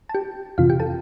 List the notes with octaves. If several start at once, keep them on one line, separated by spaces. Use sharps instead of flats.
A5
G4 G5
F2 C3 E3 F4 F5
G4 G5
A4 A5